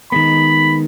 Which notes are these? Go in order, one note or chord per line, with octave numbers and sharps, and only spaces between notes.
D#3 G#3 B3 B5